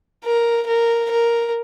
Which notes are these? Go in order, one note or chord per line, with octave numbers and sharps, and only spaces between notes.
A#4
A#4
A#4